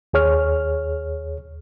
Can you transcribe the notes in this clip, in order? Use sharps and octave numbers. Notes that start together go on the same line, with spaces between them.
D#2 G#4 C#5 F6